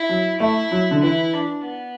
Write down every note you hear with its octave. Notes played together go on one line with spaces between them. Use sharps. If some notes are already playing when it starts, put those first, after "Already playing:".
Already playing: E4
F#3
A3 E4
F#3
D3
E3 E4
D4
B3